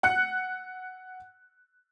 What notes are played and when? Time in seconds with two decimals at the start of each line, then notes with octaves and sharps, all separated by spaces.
0.03 F#5 F#6 C#7